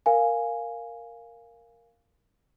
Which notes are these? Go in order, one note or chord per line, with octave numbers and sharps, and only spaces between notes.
A#4 F5 G#5